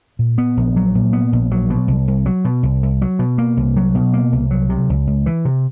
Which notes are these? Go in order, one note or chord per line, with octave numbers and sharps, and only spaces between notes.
A#2
B3
A#1
F#3
A#2
B3
A#1
F#3
B2
C2
C2
F#3
B2
C2
C2
F#3
B2
A#3
C2
F#3
B2
A#3
C2
F#3
C3
C#2
C#2
E3
C3